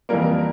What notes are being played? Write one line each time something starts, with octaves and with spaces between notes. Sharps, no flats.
F2 E3 G3 A#3 A#4